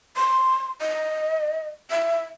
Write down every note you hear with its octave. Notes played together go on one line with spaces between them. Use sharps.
C6
D#5
E5